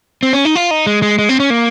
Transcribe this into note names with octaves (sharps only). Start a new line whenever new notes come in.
C4
C#4
D#4
F4
D#4
G#3
G#3
G#3
C4
C#4
A#3